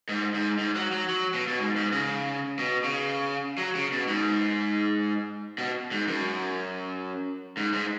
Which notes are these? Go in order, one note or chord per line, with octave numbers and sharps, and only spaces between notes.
G#2
G#2
G#2
F#3
F#3
F#3
B2
B2
G#2
G#2
C#3
B2
C#3
F#3
C#3
B2
G#2
B2
G#2
F#2
G#2
G#2